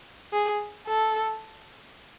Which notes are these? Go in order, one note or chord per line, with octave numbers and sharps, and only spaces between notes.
G#4
A4